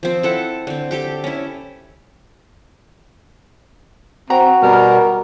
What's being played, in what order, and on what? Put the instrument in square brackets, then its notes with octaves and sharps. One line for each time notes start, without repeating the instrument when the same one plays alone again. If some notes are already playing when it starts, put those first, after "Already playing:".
[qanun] F3 C4
E4 A4 F#5
D3 C4
G4 A4 G5
C#4 E4
[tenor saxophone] C4 [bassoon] F#4 [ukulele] A#5
[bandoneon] B2 G3 B3 [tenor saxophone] A#4